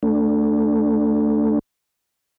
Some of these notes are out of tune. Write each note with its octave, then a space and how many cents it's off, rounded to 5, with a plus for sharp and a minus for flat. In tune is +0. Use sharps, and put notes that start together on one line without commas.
A3 +5 D4 +0